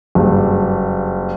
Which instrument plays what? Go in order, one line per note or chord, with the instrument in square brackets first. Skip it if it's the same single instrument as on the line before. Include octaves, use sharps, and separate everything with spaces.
[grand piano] F#1 G2